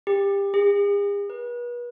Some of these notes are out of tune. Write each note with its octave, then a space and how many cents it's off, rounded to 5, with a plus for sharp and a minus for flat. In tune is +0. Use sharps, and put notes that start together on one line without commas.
G4 +25
G#4 -45
B4 -35